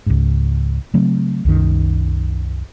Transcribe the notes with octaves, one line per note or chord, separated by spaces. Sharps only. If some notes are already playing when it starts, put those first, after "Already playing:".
C#2 G#2
C#3 F#3 A3 C4
C2 F#2 D#3